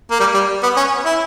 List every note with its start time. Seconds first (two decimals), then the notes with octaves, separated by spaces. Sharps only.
0.11 A#3
0.20 G3
0.34 G3
0.63 B3
0.77 C#4
1.05 E4